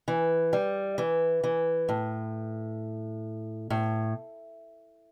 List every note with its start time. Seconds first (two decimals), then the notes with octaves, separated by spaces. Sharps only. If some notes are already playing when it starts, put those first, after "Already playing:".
0.08 E3
0.53 G3
0.98 E3
1.44 E3
1.89 A2
3.70 A2